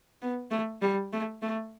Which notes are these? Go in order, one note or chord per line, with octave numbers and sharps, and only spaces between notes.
B3
A3
G3
A3
A3